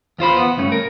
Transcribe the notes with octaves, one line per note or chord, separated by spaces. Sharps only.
E2 F4 C5 B5
B3
C#2 G2 A3 C#4
A#4